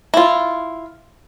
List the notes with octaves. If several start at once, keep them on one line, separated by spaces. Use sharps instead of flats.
E4 F4